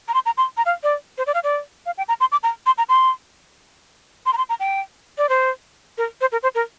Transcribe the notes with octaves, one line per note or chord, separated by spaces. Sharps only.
A#5
C6
A#5
C6
A#5
F5
D5
C5
D5
F5
D5
F5
G5
A#5
C6
D6
A#5
C6
A#5
C6
C6
A#5
C6
A#5
G5
D5
C5
A#4
C5
A#4
C5
A#4